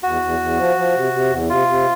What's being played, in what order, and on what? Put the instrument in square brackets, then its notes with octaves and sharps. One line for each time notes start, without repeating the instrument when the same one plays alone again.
[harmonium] E2 [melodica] F#4
[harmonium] E2
E2
F3
F3
C3
C3
E2
[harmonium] C3 [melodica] F4
[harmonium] C3